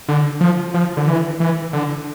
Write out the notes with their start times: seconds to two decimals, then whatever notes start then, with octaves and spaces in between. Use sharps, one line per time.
0.08 D3
0.41 F3
0.74 F3
0.97 D3
1.08 E3
1.40 E3
1.73 D3